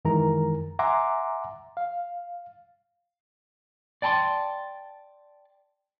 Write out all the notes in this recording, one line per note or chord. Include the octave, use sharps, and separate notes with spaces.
F#2 D#3 E3 G#3 A#4 A#5
E5 F#5 G#5 A#5 C6 D6
F5
D5 G5 A5 A#5 C6